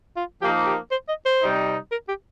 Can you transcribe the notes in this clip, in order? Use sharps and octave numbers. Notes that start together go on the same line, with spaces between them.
F4
F3 A#3 D#4 G4
G4
C5
D#5
C5
C3 G3 D#4
A#4
G4